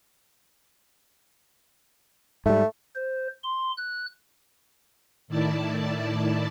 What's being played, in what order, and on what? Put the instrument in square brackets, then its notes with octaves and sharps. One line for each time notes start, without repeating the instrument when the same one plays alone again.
[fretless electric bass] G#2 G3 [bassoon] A3
[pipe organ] C5
C6
F#6
[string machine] A2 D#3 E4 D5 A5